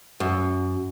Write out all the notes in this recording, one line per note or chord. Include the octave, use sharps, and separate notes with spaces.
F#2